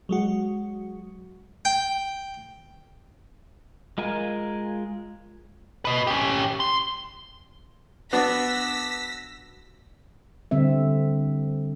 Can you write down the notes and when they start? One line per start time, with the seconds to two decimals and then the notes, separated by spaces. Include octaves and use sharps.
0.09 F#3 G#3 F#4
1.65 G5
3.98 G#3 F4 A#4 G#5
5.85 B4 D#5
6.07 C#4 G4
6.60 C6
8.13 B3 D4 F#4 E6 A#6 B6
10.51 D3 G3 C4 E5